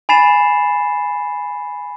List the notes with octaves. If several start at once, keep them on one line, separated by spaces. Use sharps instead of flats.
G#5 B5 A6 C7 E7